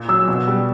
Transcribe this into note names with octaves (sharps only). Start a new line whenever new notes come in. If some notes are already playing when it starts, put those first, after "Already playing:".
Already playing: A#2
F#3 E6
B2
G3